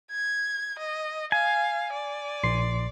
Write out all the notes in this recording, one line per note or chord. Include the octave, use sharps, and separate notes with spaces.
G#6
D#5
F5 G#5
D5
A#1 C6 C7